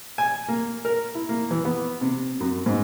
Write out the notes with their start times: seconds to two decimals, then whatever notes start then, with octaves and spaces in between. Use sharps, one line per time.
0.18 G#5
0.48 A#3
0.85 A#4
1.15 E4
1.29 A#3
1.51 E3
1.65 B3
2.01 C3
2.40 F#2
2.66 G#2